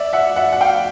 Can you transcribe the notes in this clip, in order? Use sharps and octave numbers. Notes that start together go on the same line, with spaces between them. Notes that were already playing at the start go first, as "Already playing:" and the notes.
Already playing: D5 E5
E5 F#5
E5 F#5
F#5
F5 G5